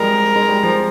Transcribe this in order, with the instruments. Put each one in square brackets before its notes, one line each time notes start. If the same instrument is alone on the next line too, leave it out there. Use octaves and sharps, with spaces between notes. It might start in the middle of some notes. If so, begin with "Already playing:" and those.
Already playing: [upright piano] F3 G3 G#3 [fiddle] A#4
[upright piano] G#3
G3
F3